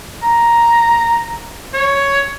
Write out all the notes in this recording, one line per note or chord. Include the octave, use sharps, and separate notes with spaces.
A#5
C#5